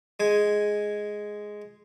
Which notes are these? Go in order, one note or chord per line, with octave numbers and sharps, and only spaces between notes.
G#3 G#5